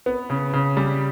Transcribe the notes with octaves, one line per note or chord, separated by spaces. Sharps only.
B3
C#3
C#3
G3